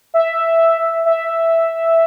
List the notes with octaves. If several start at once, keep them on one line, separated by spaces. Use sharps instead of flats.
E5
E5